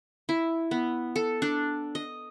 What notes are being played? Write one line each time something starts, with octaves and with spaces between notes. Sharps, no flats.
E4
B3
A4
D4
D#5